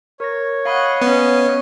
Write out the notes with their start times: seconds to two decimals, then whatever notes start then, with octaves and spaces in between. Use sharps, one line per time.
0.20 A#4 C#5 A#6
0.65 D#5 F5 F#5 B5
1.02 B3 C#4 D#5